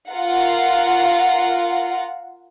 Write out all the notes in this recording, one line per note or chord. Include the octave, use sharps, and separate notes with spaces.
F4 A#4 F5 F#5